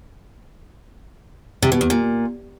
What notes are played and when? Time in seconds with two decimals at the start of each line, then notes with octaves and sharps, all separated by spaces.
1.63 C3
1.72 B2
1.81 E2
1.90 A#2